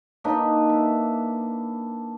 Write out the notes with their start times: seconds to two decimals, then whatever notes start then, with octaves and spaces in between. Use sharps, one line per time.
0.24 A#3 D4 D#4 B4
0.70 E5